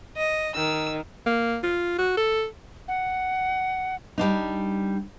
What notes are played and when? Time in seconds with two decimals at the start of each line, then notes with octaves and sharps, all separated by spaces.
0.17 D#5
0.56 D#3 E6
1.27 A#3
1.64 F4
1.98 F#4
2.17 A4
2.88 F#5
4.18 G3 D4 D#4